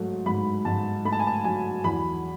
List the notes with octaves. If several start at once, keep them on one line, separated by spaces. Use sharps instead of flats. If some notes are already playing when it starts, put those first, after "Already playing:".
Already playing: G#2 F#3 A3
G#2 B5
G#2 A5
A3 B5
A5
G#5
A5
F#3 G#5
E2 B5